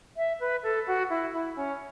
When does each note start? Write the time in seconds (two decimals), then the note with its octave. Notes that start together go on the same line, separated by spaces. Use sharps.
0.17 E5
0.40 B4
0.63 A4
0.87 F#4
1.10 E4
1.33 E4
1.56 C#4